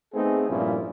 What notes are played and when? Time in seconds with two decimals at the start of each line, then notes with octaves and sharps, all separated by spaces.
0.14 A3 B3 C4 D#4 G#4
0.49 G2 A#2 F3 A3 C#4 E4